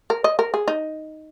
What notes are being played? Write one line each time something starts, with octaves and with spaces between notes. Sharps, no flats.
A#4
D#5
A#4
G#4
D#4